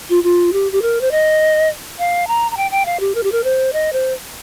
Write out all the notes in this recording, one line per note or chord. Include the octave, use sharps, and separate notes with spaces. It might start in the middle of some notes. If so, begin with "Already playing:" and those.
F4
F4
G4
G4
A#4
C5
D#5
F5
A#5
A#5
G5
G5
F5
G4
A#4
G4
A#4
C5
D#5
C5